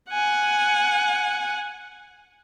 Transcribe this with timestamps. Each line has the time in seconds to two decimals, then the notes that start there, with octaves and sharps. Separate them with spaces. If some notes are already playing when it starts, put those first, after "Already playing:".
0.10 F#5 G#5